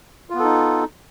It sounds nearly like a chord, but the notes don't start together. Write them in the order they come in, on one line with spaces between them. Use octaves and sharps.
F4 B3 A4 D#4